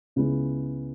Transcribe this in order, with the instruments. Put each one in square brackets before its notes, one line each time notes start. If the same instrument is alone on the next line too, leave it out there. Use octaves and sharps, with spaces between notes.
[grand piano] C#2 C#3 G#3 B3 E4